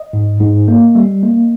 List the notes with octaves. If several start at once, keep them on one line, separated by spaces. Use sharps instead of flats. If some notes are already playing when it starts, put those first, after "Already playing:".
Already playing: D#5
G#2
G#2
A#3
G3
A#3